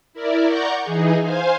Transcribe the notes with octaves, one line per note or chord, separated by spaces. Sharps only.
E4 A#4 D5
D5 F#5 A#5 C#6 G6
E3 D#4 G#4
C5 F5 G#5